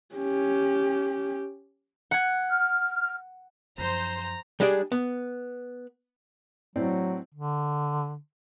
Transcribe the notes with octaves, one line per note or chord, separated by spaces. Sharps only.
C#4 G4
F#5 G#6
F6
F#2 F3 C5 A#5
G3 G#3 D4 G#4 D5
B3
A2 F#3 C4 D5
D3